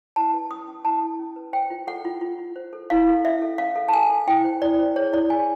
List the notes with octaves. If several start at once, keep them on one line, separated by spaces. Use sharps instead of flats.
E4 A5
B4
C#4 D#6
C#4
E4 A5
E4
C#4
B4
C5 G5
F4
A4 F#5
F4
F4
F4
C5
A4
E4 F5
A4
C#4 E5
A4
C#4 F5
A4
A5
A4 G#5
A4
E4 G5
C5
E4 D5
C5
G#4 C#5
E4 D5
G#4 G#5